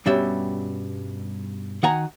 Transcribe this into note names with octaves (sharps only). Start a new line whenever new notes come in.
G2 B2 G3 C#4 E5
D#3 F#4 F#5 G#5 A#5